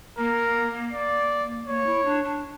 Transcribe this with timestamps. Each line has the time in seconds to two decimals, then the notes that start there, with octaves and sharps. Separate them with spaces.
0.18 A#3 A#4
0.93 D5
1.68 A#3 C#5
1.86 E4
2.05 D4
2.24 D4